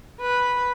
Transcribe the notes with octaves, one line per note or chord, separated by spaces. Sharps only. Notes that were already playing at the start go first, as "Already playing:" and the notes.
B4